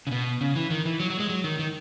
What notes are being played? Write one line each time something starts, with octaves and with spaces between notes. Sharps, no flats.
C#3
B2
C#3
E3
D#3
E3
F#3
F#3
G#3
F#3
D#3
D#3